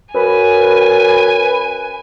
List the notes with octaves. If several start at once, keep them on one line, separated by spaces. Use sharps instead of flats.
F#2 B4 G#5